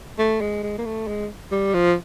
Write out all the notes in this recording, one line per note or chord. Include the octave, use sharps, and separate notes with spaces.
A3
G#3
G#3
A#3
A3
G#3
G3
F3